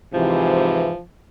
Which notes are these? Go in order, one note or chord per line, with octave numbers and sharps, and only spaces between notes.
G#2 C3 E3 F3